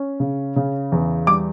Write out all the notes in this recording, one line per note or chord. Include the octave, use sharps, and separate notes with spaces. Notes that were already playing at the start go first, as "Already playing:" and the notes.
Already playing: C#4
C#3
C#3
E2
G3 D6